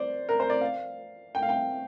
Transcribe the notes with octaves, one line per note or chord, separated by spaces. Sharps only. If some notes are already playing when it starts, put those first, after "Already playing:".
Already playing: C5 D5
A#4
C5
D5
F5
G5
F5
G5